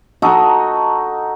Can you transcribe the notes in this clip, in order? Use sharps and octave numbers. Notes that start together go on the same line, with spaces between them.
D#4 F#4 A4